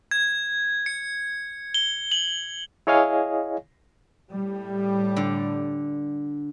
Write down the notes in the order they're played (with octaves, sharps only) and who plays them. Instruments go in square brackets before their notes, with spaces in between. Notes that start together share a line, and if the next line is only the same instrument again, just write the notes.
[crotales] G#6
C#7
G7
F#7
[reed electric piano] E4 G#4 C#5 D#5 F5 G#5
[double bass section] A2 G3
[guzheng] D3